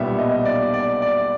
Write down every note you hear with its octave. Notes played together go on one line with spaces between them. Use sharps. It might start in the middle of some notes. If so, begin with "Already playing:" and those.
Already playing: B1 A#2 G3 B3 E5
D#5
D5
D5
D5